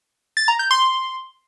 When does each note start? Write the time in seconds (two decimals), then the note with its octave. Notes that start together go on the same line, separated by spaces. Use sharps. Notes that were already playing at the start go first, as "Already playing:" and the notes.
0.37 A6
0.48 A#5
0.59 G6
0.71 C6